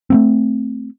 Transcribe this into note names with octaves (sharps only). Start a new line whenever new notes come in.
A3 A#3 C4